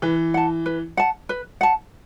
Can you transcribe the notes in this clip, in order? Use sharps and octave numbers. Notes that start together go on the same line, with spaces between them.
E3 B4
F#5 A5
B4
F#5 A5
B4
F#5 A5